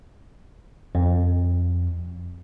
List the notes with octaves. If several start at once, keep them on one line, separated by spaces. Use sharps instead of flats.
F2